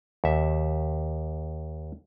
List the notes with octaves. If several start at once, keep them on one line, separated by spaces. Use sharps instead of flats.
D#2 E5